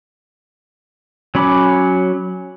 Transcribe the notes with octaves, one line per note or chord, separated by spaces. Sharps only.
F#3 C#4 B5 D6